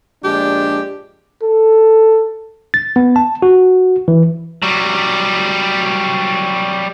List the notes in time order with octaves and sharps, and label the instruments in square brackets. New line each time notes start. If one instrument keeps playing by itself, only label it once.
[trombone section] A#1 G#3 D4 [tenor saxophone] G4
[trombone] A4
[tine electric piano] A6
B3
A5
F#4
E3
[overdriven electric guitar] F#3 G3